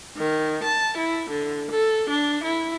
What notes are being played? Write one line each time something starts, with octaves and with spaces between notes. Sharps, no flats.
D#3
A5
E4
D3
A4
D4
E4